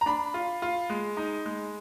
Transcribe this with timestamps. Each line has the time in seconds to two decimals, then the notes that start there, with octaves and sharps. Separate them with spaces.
0.01 A#5
0.06 D4 B5
0.34 F4
0.62 F4
0.90 G#3
1.17 D#4
1.46 G#3